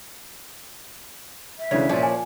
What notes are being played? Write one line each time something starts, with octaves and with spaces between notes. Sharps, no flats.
E5
D2 C#3 E3 C#5
A#2 F3 C#4 D4 A5
G#5